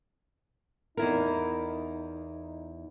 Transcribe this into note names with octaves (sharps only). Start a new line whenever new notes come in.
E2 D#4 E4 A#4